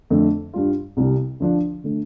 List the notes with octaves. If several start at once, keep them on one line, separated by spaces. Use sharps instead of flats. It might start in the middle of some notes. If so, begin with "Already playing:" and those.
F2 D3 A3
G2 G3 F4
C2 C3 G3
D2 D3 F3 D4
D3 A3